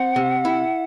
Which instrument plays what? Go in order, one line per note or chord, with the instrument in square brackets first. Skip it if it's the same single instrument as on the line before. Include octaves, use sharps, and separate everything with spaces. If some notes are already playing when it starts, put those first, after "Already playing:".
Already playing: [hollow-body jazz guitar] C4 [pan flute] F#5
[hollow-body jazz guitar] C3
E4